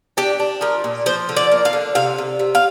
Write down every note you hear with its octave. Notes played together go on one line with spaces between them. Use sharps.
D4 G4
D4
F3 A#4
A#2
F3 C5
D3
D5
A#3
F5
D3
C3 F5
C3
C3
F5